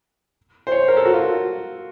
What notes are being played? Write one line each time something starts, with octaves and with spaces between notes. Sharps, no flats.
C5
C#5
A#4
A4
F#4
F4